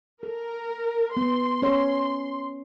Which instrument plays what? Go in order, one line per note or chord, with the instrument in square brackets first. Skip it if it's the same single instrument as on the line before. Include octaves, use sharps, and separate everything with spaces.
[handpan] A4 [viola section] A#4
[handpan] B3 [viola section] C6
[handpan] C#4 C#5